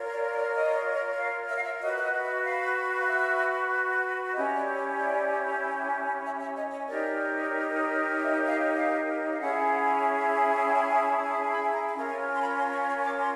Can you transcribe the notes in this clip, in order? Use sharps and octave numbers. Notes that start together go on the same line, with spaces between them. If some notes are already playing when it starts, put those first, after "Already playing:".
Already playing: F4 A#4 C#5
D5
D5
D#5
F5
E5
F5
E5
F#4 B4 D#5
E5
D#5
E5
F5
F5
E5
C#4 E4 G4 D#5
D5
C#5
D5
E5
E5
D#5
C#5
D#4 G4 A#4 C#5 D5
D#5
E5
D#5
F5
F5
F5
C#4 E4 G#4 F#5
G#5
G5
A5
G#5
A5
A5
A5
B5
A#5
B5
C#4 F4 A#4 C#5 A#5
G#5
C6
B5
C6
C#6
C#6
D6
C6